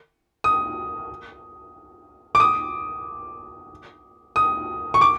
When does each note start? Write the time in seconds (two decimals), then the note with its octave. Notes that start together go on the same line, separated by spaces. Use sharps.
0.44 D#6
2.35 D6
2.40 D#6
4.36 D#6
4.94 C#6
5.01 D6